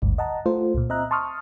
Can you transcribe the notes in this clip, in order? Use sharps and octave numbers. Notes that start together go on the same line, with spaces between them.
G#1 D2 G2
D#5 F#5 A5 A#5
A3 F4 C5
C#2 A#2
C4 D#5 E5 A#5 F#6
A5 C6 C#6 D#6 F6